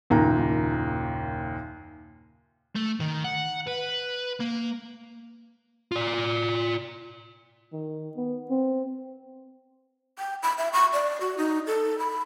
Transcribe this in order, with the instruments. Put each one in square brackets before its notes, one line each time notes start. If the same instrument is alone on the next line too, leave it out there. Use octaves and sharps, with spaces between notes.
[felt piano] F#1 D#2 A#2 A#5
[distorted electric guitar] A3
D#3
F#5
B4
A#3
[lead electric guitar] F4 D5
[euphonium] D#3
B3
C4
[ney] G5
B5
E5
C#6
D5
F#4
D#4
A4
B5